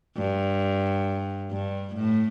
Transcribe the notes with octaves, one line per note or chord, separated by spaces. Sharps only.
G2
G2
A2